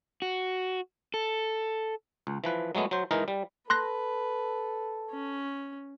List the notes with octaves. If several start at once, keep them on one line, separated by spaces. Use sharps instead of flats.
F#4
A4
C#2
E3 F3 B4
F#3 G#3 A3 B3
F#3 C5
E3 G#3 D#4 A#4
G3
A4 B4 C6 F#6 A#6
C#4